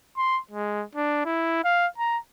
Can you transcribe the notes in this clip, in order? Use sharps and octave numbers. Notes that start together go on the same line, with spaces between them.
C6
G#3
D4
E4
F5
A#5